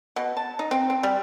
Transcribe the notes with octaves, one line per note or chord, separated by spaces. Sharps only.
B2
A5
D#4
C4
C4
G3